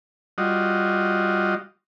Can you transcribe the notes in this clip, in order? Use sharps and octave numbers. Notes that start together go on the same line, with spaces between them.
G3 F4 F#4 D#5